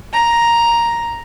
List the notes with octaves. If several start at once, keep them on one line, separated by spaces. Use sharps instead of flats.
A#5